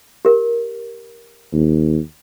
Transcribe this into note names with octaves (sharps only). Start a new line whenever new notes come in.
G4 A#4
D#2